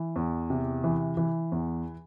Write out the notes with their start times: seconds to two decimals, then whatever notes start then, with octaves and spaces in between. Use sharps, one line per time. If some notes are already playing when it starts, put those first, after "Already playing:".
Already playing: E3
0.16 E2
0.50 C3
0.84 E3
1.17 E3
1.52 E2